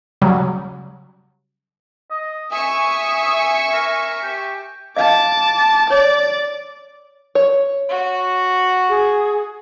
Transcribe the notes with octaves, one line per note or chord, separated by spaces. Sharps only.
C#3 F#3 G3
D#5
E5 G#5 C#6 D#6
A#4
G4
D#5 F5 A5 D6
C#5 D5
C#5
F#4
G#4